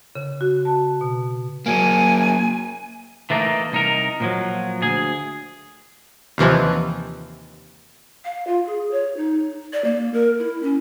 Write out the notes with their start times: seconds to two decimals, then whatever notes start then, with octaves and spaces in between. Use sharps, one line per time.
0.15 C#3
0.41 F#4
0.65 A5
1.01 B2
1.66 F#3 A#3 G#5
3.30 E3 A3 A#3 D4 D#4
3.72 C2 D#4 A#4
4.20 A#2 F3 F#3
4.82 D2 G#4
6.38 D#2 C3 E3 F3
8.25 F5
8.47 F4
8.67 G#4
8.91 C#5
9.17 D#4
9.73 D5
9.84 A#3
10.14 A#4
10.39 E4
10.62 C#4